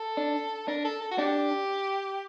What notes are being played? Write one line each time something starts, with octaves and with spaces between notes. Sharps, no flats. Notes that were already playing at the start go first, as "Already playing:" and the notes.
Already playing: A4
D4
D4 A#4
A4
A4
F#4
D4 G4